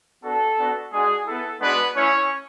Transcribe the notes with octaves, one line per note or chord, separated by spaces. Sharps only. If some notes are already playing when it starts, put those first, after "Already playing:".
B3 D4 F#4 A4
B3 D4 F#4
G#3 D4 F#4 G#4
B3 E4 A4
G#3 B3 D4 F#4 B4
A3 C#4 E4 C#5